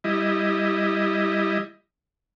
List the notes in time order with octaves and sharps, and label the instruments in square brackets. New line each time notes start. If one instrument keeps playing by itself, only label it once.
[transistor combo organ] G3 E4 D#5